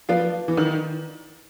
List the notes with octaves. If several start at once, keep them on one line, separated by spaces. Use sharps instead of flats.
F3 B4 D5 F5
E3
D#3